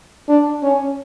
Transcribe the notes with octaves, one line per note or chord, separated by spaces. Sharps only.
D4
C#4